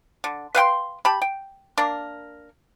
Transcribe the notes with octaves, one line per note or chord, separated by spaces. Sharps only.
D3
B4 F5 G5 C6
G4 A5 B5
G5
A#3 D4 A#4